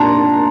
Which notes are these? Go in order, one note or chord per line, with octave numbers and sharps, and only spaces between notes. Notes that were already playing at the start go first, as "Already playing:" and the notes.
Already playing: A#2 A#3 D4 A5 A#5 C6